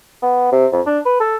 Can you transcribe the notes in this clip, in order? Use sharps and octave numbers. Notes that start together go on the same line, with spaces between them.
B3
C3
F2
D4
B4
A4